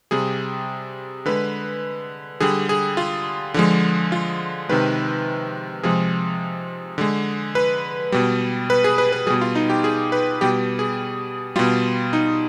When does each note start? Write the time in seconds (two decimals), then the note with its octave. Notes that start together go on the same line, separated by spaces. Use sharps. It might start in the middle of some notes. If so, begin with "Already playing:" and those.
0.11 C3 G3 G#4
1.26 D3 G#3 B4
2.40 D3 G3 G#4
2.69 G#4
2.97 F4
3.54 D3 F3 G#3
4.12 F4
4.69 C3 D#3 G#3 B4
5.83 C3 F3 G#3 G#4
6.98 D3 G#3
7.55 B4
8.12 B2 G3
8.70 B4
8.84 G#4
8.98 B4
9.12 B4
9.27 B2 G3 G#4
9.41 F4
9.55 D#4
9.70 G4
9.84 G#4
10.12 B4
10.41 B2 G3 G4
10.79 G#4
11.56 B2 G3 F4
12.13 D#4